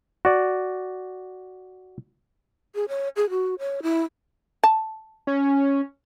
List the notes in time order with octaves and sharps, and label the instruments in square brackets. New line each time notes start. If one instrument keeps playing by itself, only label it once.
[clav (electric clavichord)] F#4 D5
[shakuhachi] G#4
C#5
G#4
F#4
C#5
E4
[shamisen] A5
[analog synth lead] C#4